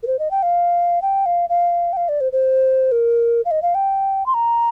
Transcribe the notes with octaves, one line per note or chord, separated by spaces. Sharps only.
A#4
C5
D#5
G5
F5
G5
F5
F5
G5
F5
D5
C5
C5
A#4
F5
D#5
F5
G5
C6
A#5